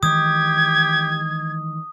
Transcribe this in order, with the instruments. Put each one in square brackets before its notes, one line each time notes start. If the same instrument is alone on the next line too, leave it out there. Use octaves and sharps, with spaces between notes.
[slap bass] D#3 E3 G#3 [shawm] G4 [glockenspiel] D#6 [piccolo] G#6